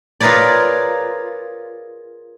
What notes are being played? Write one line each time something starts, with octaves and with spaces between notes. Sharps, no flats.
F4 G#4 A#4 B4 C#5 D5